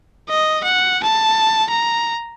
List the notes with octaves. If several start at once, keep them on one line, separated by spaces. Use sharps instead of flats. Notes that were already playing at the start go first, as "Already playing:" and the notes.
D#5
F#5
A5
A#5